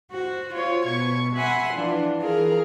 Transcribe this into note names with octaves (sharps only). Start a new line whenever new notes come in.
F#4 C5
F4 C5 C#5
B2 C#6 G#6
E5 F#5 G#5 B5 C6
E3 F3 D4 F4
E3 G#4 A#4 F5